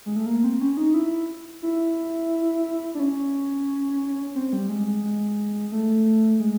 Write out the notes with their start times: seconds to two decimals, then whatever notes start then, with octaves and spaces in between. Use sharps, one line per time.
0.06 G#3
0.16 A3
0.26 A#3
0.44 C4
0.61 C#4
0.77 D#4
0.94 E4
1.62 E4
2.95 D4
2.99 C#4
4.35 C4
4.53 G3
4.69 G#3
4.87 G#3
5.04 G#3
5.72 A3
6.40 G#3